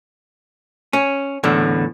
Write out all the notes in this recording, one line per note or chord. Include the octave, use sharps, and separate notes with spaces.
C#4
E2 A2 D3